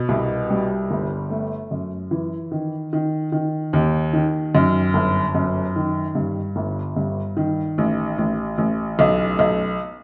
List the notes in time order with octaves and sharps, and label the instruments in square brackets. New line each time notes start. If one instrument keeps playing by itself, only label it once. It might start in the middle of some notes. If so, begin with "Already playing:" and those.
Already playing: [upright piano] B2
C2
G3
G1
A3
F#2
E3
D#3
D#3
D#3
D#2
D#3
F#2
G1
F#2
D#3
G2
G1
G2
D#3
A1
A1
A1
B1
B1